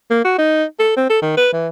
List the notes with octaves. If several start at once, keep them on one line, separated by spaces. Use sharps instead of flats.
A#3
F#4
D#4
A4
C4
A4
D#3
B4
E3